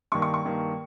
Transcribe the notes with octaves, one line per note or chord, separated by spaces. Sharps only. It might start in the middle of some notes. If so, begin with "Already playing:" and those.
G2 D#3 A#3 C#6
C#6
C#6
G2 D#3 A#3